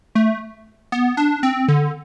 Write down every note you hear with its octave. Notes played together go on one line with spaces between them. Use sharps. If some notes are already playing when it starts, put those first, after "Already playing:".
A3
B3
D4
C4
D3